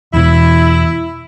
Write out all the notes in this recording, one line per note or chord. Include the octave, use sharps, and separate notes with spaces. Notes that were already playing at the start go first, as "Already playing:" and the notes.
E2 B2 E4